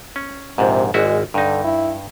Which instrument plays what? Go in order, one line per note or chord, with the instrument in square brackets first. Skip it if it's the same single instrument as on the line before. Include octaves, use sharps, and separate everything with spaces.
[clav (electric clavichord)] C#4
[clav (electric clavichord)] A#1 G#2 [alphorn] C3
[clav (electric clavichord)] G#1 E4 F#4 [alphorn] G#3
[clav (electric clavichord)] G2 D#4 [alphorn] D3
[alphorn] E4